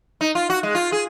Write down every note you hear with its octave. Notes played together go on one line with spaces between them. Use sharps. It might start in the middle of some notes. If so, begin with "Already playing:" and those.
D#4
F4
F#4
G#3
F4
G#4